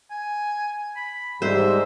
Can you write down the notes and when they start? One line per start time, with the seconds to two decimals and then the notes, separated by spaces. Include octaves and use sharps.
0.11 G#5
0.96 B5
1.42 G#2 G3 C5 E5